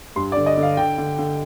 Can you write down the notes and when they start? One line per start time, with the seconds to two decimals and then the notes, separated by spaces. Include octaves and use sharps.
0.16 G2 C6
0.32 D5
0.37 D3
0.46 D#5
0.57 D3
0.63 F5
0.77 D3 G5
0.98 D3
1.19 D3